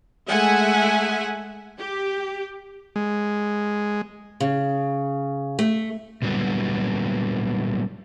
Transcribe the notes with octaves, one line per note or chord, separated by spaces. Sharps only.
G#3 A3 E5 F#5 G#5
G4
G#3
C#3
A3
A#2 D3 F#3 G3 B3